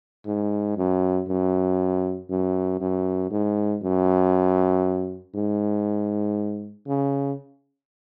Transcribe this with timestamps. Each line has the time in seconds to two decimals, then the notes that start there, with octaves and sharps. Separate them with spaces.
0.26 G#2
0.77 F#2
1.28 F#2
2.30 F#2
2.80 F#2
3.31 G#2
3.82 F#2
5.34 G#2
6.87 C#3